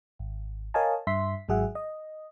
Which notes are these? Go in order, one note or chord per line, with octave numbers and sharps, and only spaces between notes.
G#1
A#4 C#5 D#5 F5 G#5 A5
G2 E5 C6 B6
G#1 G#2 F#3 G#4 E5 F#5
D#5